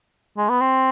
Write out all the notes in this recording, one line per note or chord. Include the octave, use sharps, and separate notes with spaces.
G#3
B3
C4